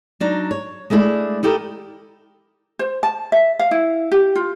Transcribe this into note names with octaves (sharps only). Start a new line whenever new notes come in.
F#3 D4 D#4
C#5
G#3 A3 D4 E4 G#4 D5
D#4 E4 G4 A4 A#4
C5
A5
E5
F5
E4
G4
F4